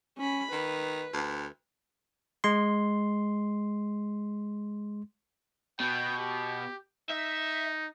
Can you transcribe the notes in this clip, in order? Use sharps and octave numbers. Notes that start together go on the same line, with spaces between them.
C#4 B5
D#3 B4
D2
G#3 C6
B2 G5
G4
D#4 E5